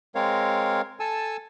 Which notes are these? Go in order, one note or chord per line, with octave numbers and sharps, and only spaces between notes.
G#3 C4 A#4 C#5 F5
A4 G#5 A5 E6